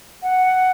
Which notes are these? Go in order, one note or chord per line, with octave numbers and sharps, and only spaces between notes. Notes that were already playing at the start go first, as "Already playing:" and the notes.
F#5